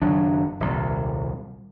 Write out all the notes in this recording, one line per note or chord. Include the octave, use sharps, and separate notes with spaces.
F#1 D#3 F#3 D4
D#1 C2